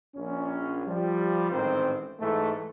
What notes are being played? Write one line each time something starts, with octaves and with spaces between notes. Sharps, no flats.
A#1 C#4
F3 G3
A1 G#2 D#3 C4 C5
G#2 E3 A3